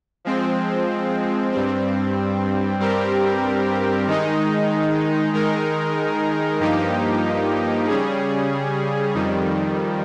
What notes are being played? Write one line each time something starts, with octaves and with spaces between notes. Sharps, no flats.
F3 G#3 C4
G2 G3 C4
G2 G3 C4 G4 A#4
D#3 G#3 D#4
D#3 G#3 D#4 A#4
G2 F3 A#3 D#4 G4
C#3 G3 C#4 G#4
F2 D#3 G3